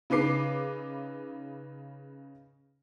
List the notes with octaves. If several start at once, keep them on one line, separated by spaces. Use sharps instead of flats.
C#3 D#4 B4 D6 C7